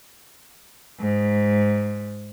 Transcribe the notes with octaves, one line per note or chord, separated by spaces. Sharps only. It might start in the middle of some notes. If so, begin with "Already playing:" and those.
G#2